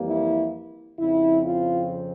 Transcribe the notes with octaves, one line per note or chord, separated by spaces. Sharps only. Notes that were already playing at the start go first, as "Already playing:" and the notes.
Already playing: F2 E3 G3 A#3
E4
F2 C#3 F3 C4 E4
F4